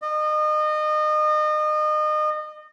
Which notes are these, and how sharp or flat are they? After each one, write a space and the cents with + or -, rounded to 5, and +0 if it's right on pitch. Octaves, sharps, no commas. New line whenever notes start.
D#5 -30